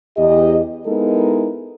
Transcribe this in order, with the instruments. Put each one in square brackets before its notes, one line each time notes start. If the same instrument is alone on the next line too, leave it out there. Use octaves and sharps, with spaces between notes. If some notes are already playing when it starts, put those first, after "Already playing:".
[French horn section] E2 G4 D#5
G#3 B3 D#4 E4 A4 A#4